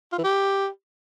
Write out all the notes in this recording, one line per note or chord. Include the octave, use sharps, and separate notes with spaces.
F4
E3
G4